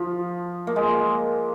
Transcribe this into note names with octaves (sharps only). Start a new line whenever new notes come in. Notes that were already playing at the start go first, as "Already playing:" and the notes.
Already playing: F3
A#3
G#3